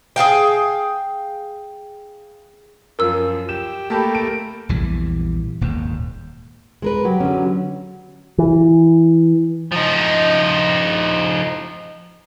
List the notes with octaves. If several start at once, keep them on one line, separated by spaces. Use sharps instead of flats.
G#4 A4 F5 G5
F#2 F3 A#4 E6
G4 E7
A3 A#3 G4 A5 B5
D7
A#1 E2 E3 G3
D#1 D#2 G#2
G#3 A#4 B4
F#3 G4
D3 F#3 C#4
E3
F3 D#4